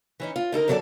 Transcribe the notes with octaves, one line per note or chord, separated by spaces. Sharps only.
E3 C#4 D#4
F4
D3 D#4 A4 A#4
F#2 D3 F#3 F4 A4 D5